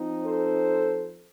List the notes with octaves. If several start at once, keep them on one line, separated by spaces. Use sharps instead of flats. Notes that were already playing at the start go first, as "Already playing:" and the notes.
Already playing: F3 C4 D#4
A4 C5